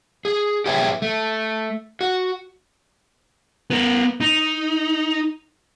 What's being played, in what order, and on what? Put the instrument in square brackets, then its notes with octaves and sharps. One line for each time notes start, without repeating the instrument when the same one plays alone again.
[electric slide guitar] G#4
G4 G#4 B4 C#5 E5 G5
A3
F#4
[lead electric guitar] B3 A#4
D#4